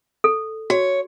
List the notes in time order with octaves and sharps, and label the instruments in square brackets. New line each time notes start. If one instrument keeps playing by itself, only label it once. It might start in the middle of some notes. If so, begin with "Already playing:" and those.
[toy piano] A4
[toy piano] F#4 [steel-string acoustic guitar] C#5